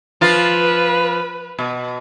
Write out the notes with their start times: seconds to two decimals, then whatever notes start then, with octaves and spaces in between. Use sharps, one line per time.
0.21 F3 F4 B4
1.59 B2